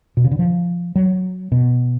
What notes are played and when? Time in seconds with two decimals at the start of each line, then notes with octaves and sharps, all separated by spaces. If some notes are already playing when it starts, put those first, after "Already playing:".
0.17 B2
0.24 C#3
0.31 D3
0.39 F3
0.96 F#3
1.52 B2